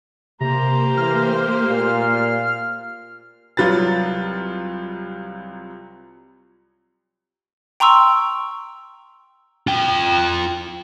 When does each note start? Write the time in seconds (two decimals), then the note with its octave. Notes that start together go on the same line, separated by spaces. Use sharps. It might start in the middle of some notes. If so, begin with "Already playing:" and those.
0.41 C3 A#3 G4 C5 A#5
0.97 E3 F6
1.69 A#2 F5
3.57 C2 F#3 F4 B4 A6
7.80 G5 A#5 C6 C#6 E6
9.67 F4 G5